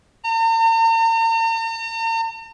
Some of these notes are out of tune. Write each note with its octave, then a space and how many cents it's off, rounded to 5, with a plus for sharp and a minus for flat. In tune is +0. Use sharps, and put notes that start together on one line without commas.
A#5 -45